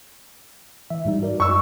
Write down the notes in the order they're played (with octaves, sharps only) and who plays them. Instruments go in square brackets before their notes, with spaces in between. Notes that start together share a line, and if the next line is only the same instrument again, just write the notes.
[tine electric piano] E3 E5
G#2 G3 D#4
F#4 A#4 D5
[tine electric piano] F#2 [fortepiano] C#6 E6